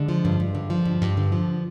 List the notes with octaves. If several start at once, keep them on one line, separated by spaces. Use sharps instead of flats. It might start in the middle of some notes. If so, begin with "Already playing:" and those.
Already playing: D3 G#3
F3
G2
G2
D3
F3
G2
G2
D3
F3